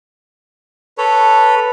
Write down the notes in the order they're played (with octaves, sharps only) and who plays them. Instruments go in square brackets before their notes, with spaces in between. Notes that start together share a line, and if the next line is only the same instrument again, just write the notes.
[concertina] A4 C#5 [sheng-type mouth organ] B4